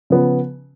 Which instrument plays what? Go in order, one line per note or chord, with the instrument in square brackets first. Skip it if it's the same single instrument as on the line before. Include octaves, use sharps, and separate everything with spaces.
[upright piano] C#3 F3 B3